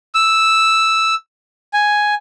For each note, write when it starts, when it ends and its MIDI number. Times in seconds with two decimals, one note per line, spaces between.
0.15 1.14 88
1.74 2.14 80